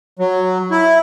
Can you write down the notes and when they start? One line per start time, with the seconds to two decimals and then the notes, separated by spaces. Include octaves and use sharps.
0.19 F#3
0.71 E4